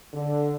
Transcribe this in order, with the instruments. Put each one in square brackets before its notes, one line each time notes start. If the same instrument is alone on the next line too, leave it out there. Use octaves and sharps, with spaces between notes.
[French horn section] D3